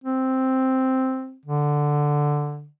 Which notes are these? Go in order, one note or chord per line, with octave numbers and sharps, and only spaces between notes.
C4
D3